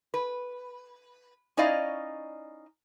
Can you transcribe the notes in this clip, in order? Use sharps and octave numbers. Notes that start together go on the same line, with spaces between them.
B4
C#4 D#4 E4 D5 D#5 F5